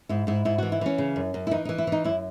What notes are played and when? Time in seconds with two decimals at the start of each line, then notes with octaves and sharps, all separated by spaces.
0.09 G#2 E4
0.27 G#2 E4
0.45 G#2 E4
0.58 E3 F#4
0.72 E4
0.81 E3 C#4
0.98 C#3
1.16 F#2
1.34 F#2
1.47 E4
1.51 E3 D#4
1.65 E3 D#4
1.78 E4
1.87 E3 D#4
2.04 F#2 E4